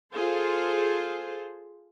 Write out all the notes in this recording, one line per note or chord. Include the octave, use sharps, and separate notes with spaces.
F4 G#4 A4 C5